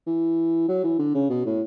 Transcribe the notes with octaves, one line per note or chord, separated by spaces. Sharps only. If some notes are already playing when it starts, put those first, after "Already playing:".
E3
F#3
E3
D3
C#3
B2
A2